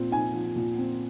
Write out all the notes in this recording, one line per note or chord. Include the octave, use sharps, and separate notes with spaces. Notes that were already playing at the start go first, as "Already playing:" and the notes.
Already playing: A#2 F3 C4
D#4 G#5
F3
A#2
C4